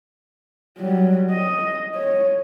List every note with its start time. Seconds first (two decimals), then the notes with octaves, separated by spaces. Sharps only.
0.78 F#3 G3
1.31 D#5
1.95 C#5